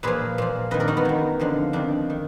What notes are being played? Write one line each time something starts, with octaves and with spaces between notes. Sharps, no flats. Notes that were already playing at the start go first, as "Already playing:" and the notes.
A#2 F3 G#4 B4
A#2 F3
F2 D#3 B4 D#5
A#4 D5
D#4 F#4
B3
F#2 D#3
F2 D3 F3
F2 D#3 D4
D#3